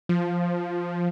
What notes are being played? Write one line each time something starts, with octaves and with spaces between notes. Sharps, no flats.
F3